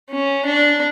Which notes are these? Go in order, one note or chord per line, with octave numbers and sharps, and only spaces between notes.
C#4
D4